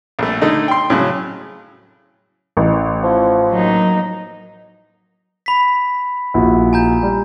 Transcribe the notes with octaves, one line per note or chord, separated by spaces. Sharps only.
A#1 A3
D3 A3 D#4
G5 C6
A2 C#3 F#3
A1
F3
F#3 A#3 D#4
B5 B6
A#1 E4 F#4
G#5 A#5 G6
G3